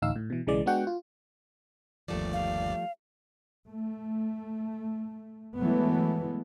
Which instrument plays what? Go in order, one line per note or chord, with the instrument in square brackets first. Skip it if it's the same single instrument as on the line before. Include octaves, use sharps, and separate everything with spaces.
[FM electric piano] A1 D2 D#4 F5 E6
A2
B2 E3
B1 C#3 E3 G#3 D5
G#3 B3 D4 F#4 F#5 G5
F4
[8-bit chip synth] G1 D#2 D5 [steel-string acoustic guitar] F3 G3 A3
[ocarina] F5
[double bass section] A3
E3 F#3 G#3 A3 B3